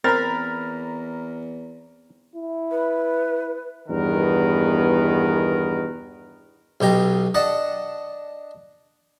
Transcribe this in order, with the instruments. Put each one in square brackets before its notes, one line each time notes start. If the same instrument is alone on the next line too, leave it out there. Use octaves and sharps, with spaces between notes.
[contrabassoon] E2 [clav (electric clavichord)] C4 [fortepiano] A#4 [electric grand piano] A#5 B5 A6
[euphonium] E4
[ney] B4
[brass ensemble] E2 G2 B2 D#3 A#4 B4
[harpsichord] B1 B2 G4 A#5
D4 D#5 F#5 A5